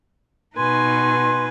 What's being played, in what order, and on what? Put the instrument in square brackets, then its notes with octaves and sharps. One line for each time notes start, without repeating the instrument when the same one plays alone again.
[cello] B2 D#4 [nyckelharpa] B4 G#5 [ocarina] C6